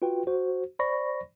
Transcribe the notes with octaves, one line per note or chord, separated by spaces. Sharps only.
F4 F#4 B4 G5
F#4 C5
C5 D5 B5 C#6 A#6